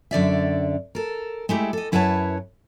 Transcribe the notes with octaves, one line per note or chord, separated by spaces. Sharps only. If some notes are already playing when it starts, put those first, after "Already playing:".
F#2 D3 D5 E5
A4 A#4
G#3 A3 E4 G4
A4 D#5
F#2 E4 B4 C#5 F#5 A5